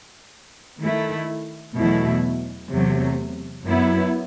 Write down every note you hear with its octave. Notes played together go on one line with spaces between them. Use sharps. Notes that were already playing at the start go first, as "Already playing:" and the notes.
D#3 A3 E4
E2 B2 F#3 A3 E4
E2 C3 F#3 A3
F#2 F#3 B3 E4